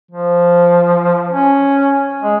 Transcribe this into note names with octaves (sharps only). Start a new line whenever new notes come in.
F3
C#4
G#3